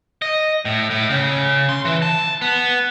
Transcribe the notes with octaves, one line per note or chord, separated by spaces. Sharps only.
D#5
A2
A2
C#3
C6
E3
A5
B3